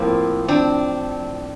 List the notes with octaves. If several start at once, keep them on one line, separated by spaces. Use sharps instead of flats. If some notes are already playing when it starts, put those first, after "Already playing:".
Already playing: A2 F3 A#3 C4
C4 D4